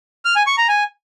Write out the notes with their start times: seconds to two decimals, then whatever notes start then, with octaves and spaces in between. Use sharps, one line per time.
0.25 F6
0.36 G#5
0.47 C#6
0.58 A#5
0.68 G#5